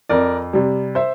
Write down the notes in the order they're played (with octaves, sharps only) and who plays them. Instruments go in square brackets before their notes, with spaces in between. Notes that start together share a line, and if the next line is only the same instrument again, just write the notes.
[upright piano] F2 A#4 D5
C3 G3
C5 E5